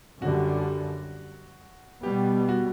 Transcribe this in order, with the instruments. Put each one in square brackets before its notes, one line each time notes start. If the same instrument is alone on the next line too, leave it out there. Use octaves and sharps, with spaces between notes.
[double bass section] F#2 D3 G3 [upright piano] F#4
[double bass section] B2 G3 B3 [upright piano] G4
[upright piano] F#4